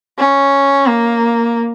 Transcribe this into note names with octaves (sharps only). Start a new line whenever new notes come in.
C#4
A#3